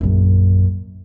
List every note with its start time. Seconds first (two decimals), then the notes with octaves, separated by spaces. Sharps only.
0.01 A#1 F#2